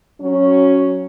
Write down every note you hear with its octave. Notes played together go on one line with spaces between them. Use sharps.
F#3 C#4